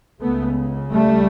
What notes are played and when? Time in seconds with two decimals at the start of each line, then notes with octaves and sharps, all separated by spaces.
0.21 C#2 C#3 A3 B3
0.90 G3 A3